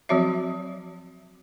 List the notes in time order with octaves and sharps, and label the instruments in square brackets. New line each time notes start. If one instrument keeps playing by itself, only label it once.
[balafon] F3 F#3 C4 F#4 C#5 E5